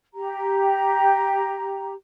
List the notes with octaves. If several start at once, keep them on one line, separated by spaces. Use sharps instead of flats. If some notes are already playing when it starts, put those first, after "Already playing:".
G4 A#5